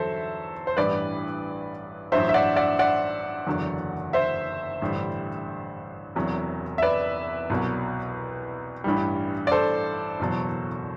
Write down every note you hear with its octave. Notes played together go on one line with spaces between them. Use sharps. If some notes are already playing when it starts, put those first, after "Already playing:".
Already playing: E2 D3 F#3 A4 C5 E5
C5
A1 G2 E3 G3 B4 D5
A1 G2 F#3 C5 E5
E5
D5 F#5
D5 F#5
D5 F#5
F#1 E2 D3 F#3
C5 E5
A1 G2 D3 G3
E1 E2 C3 F#3
E5
B4 D5
C2 B2 F#3
A1 G2 E3 G3
D5
A4 C5
F#1 E2 B2 F#3